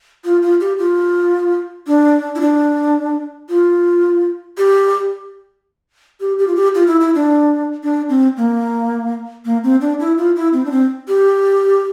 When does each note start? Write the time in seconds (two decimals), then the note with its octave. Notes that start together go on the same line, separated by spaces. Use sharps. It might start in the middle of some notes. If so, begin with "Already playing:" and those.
0.24 F4
0.42 F4
0.60 G4
0.78 F4
1.87 D4
2.35 E4
2.40 D4
3.49 F4
4.58 G4
6.20 G4
6.38 G4
6.47 F4
6.56 G4
6.75 F4
6.87 E4
7.01 E4
7.15 D4
7.83 D4
8.09 C4
8.37 A#3
9.45 A#3
9.64 C4
9.81 D4
10.00 E4
10.18 F4
10.36 E4
10.53 C4
10.65 D4
10.71 C4
11.08 G4